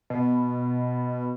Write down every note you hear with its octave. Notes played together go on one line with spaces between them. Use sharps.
B2